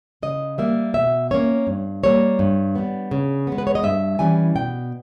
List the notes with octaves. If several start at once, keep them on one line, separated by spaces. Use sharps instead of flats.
C#3 D#5
G3 A#3 E5
B2 E5
A#3 C#4 C#5
G2
G3 A#3 C#5
G2
G3 B3
C#3
G#3 B3
B4
C#5
D#5
G2 E5
E3 G3 C#4 G#5
B2 G5